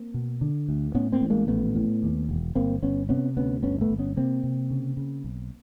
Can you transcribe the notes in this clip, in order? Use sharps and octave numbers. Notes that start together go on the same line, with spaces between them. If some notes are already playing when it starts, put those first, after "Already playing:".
Already playing: A#3 C4
B2
D3
D2
A2 B3 C#4
A#3 C4
A1
G#3 A#3
A#1 A3 B3
A2
D#2
E1
G1 A#3 C4
G1 B3 C#4
C3 B3 C#4
D2 B3 C#4
G1 B3 C#4
A3 B3
G1
B3 C#4
C3 A#3 C4
C3
C#3
C#3
B1